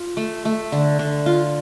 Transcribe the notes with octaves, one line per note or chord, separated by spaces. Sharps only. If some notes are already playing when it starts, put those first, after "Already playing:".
Already playing: F4
A3
A3
D3
D3
F4